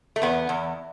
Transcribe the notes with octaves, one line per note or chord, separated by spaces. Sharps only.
A3
E2 B3
E2